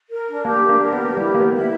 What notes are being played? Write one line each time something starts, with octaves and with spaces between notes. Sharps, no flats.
A#4
D4
A#3 G4
D4
A#3
A#4
B3
G4
G3 E4
A#3 A#4
B3
E4